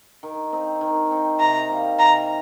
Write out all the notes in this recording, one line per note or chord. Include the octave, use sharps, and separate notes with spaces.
D#3
C4 D#4
D#3
C4 D#4
C3 A#5
G3 A#3
C3 A#5